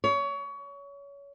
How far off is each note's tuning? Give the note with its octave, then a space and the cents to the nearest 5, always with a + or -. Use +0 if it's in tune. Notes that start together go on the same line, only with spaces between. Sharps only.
C#5 +25